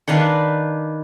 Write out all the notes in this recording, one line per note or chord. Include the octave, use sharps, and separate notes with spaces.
D#3 D4 B4 F5